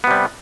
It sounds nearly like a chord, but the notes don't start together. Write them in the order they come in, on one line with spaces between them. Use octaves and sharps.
B3 C3 G3